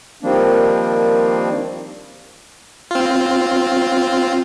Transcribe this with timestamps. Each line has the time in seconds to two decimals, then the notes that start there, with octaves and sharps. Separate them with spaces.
0.23 D#3 F3 G3 A#3 C4 D4
2.91 C4 F4